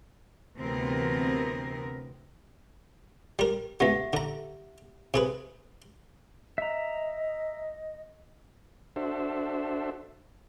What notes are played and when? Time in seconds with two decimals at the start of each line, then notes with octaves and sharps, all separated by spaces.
0.58 D2 C3 E3 B3 C4 A#4
3.39 G3 A#4
3.80 C#2 B3 G4 E5 F#5
4.13 D3 A#5
5.14 C3 G#4 B4
6.58 D#5 E5 A#5
8.96 D4 F#4 A4 C5 E5